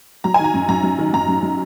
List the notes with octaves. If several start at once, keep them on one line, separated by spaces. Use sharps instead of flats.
F#3 A#5
D#3 G#5
A#5
F#2
F#2 A#5
F#3
D#3
F#2 A#5
F#2
F#3